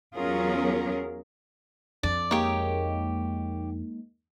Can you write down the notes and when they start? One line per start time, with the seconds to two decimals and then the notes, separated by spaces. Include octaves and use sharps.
0.15 E2 F#3 C#4 F4 G#4 A#4
2.03 F2 D4 D5
2.31 G#3 A#3 D#4 G4 C#5